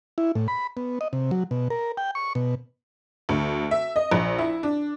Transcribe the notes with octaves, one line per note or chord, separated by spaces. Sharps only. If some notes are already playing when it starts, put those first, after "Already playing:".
E4
A2
B5
B3
D#5
C3
F#3
B2
A#4
G5
C#6
B2
D2
E5
D#5
A#1
E4
D4